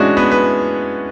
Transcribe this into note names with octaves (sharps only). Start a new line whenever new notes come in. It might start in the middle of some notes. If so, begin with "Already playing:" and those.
Already playing: A2 E3 G#3 C#4 D4 F#4
B3 B4
B4